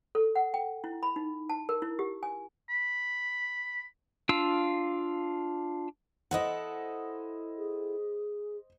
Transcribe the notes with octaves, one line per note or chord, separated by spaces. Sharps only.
A4
F#5
G5
E4
B5
D#4
A5
A#4
E4
G4
G#5
B5
D4 F4 F5 E6
E4 A4 C5 D#5 F#5
G#4